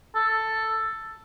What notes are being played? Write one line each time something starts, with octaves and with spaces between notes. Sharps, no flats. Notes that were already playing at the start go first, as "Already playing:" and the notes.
A4